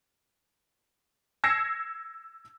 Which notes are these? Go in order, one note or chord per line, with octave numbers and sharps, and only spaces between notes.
E6 G#6 A#6 C7 C#7 E7